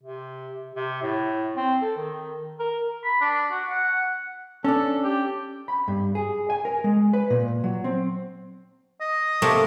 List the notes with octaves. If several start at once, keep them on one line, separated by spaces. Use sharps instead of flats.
C3
C3
A2
C4
A4
D#3
A#4
B5
D4
F#4
F#5
C#4 D4 A4
G4
B5
G2
G#4
G#5
A#4
G#3
B4
A#2
F#3
C4
D#5
C3 A3 A#3